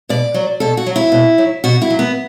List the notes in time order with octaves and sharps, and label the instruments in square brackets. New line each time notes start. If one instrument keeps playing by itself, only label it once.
[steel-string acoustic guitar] B2 D5
F#3
B2 A4
F#4
F#3
E4
B2
F#3
B2 F#4
E4
F#3
B3